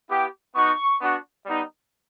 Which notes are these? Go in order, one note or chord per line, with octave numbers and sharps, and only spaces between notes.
B3 E4 G4
B3 D#4 F#4 C#6
B3 D4 F#4
G3 B3 D#4